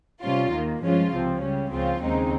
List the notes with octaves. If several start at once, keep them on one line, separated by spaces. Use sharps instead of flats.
C3 G3 C#4 F4
D#2 D#3 A#3
G2 F3 G#3 C#4 F4
C#2 C3 F3 C4
C#3 G3 C#4
C#2 C#3 F3 C4 F4
D#2 C#3 G#3 C4 D#4